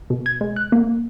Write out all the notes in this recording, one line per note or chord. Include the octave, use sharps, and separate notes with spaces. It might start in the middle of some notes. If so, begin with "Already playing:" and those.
B2
G#6
G#3
F#6
A#3